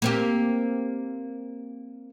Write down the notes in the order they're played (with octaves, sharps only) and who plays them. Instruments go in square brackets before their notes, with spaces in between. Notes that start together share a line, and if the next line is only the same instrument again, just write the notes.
[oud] A#3 C4 G4